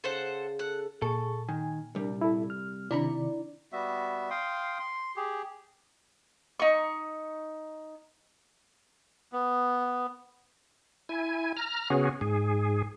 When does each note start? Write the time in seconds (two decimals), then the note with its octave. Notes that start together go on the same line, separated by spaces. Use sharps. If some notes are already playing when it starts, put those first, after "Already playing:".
0.04 C#3 A4 C5 F#5
0.59 A4 F#5
1.02 A#2 G#4 A4 C#6
1.49 D#3 G#5
1.95 C2 G3 D4 A#4
2.21 E4 A4
2.50 F6
2.91 C3 D#3 D4 E4 D5 A#5 B5
3.72 G3 B3 F#4 E5
4.30 F5 G5 C6 D#6
4.79 C6
5.16 G4 G#4
6.60 D#4 C#6
9.33 B3
11.09 E4 G#5
11.57 A#5 F6
11.90 C#3 B3 C#4 F#4 G#4
12.21 G#2 G#4